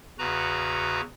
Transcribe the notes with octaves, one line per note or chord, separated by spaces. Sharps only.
E2 C#3 F#4 B4 A#5